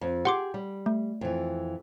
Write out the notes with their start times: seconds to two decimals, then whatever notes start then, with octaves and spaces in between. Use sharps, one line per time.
0.01 F2
0.25 G4 G#4 F#5 C6 D6
0.54 G3
0.86 A3
1.21 F2 E3